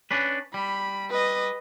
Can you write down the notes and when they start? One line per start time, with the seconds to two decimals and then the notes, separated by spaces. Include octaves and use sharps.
0.11 C#4 D4 B4
0.54 G3 B5
1.11 B4 D#5